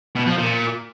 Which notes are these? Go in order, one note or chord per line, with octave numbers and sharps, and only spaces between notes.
B2
F3
A#2